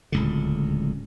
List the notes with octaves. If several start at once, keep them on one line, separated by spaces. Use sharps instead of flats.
D1 C#2 D3